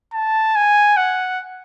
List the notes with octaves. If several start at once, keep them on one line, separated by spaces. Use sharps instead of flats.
A5
G#5
F#5